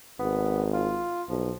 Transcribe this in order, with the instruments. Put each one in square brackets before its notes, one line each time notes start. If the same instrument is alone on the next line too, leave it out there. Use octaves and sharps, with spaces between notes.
[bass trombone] G#1 [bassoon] B3
[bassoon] F4
[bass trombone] B1 [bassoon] F3